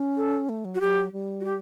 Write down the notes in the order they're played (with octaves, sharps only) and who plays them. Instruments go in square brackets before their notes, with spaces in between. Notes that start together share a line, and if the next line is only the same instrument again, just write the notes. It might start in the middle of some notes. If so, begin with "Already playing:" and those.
Already playing: [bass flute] C#4
[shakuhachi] A4
[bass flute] A3
F#3
[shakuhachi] F#4
[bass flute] F#3 [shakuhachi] G4
[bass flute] G3
[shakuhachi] F#4
G4